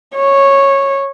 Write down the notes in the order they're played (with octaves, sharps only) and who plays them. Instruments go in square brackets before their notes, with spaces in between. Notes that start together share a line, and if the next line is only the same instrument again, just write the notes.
[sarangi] C#5